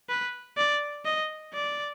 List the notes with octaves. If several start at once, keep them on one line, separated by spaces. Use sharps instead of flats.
B4
D5
D#5
D5